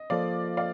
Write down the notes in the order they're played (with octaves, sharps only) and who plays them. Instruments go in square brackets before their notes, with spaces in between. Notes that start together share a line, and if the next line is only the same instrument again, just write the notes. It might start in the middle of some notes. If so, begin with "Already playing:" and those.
Already playing: [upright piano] D#5
[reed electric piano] F3 A#3 F4 A4 C5 [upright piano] D5 F5
[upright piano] D5 F5